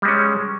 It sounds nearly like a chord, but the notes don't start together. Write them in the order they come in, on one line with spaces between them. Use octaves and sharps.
G3 G#3 C#4